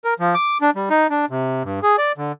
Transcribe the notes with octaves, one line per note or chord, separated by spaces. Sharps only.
A#4
F3
D6
D4
G3
D#4
D4
C3
G2
G#4
D5
D3